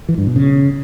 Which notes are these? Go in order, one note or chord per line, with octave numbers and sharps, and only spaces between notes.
E3
G2
B2
C#3